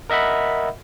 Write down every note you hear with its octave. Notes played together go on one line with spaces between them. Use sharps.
A#4 D#5 E5 F#5 B5